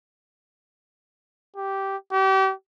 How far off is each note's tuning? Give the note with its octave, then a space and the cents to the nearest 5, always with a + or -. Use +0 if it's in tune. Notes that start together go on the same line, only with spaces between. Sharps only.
G4 -10
G4 -35